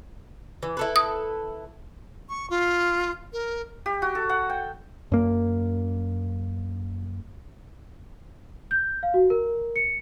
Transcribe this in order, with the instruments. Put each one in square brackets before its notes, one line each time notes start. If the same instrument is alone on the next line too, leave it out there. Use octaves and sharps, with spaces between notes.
[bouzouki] E3
E4 A4 B4
[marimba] D#6
[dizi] C#6
F4
A#4
[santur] G4
F#4
A4
F#5
G5
[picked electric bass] F#2 A#3
[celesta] G6
F5
F#4
A#4
C#7